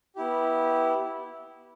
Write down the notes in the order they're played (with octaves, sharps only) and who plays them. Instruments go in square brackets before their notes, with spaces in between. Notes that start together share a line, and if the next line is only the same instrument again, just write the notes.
[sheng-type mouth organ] B3 E4 G4